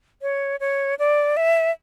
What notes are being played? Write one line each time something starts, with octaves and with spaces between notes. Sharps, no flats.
C#5
C#5
D5
E5